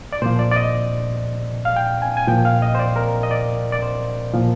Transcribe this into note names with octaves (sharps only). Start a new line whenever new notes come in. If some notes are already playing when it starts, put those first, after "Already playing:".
D5
A#2 F3 C5
D5
D5
D#5
F5
G5
G#5
G#5
A#2 F3 G5
F5
D#5
C5
D5
A#4
D#5
D5
D5
C5
A#2 F3